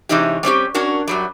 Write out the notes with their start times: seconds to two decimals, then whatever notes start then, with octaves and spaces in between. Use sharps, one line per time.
0.09 C3 E3 G#3 C#4 D#4 G4
0.43 G3 C4 C#4 G4
0.74 C#4 D4 F#4 A#4
1.08 F#2 F#3 G3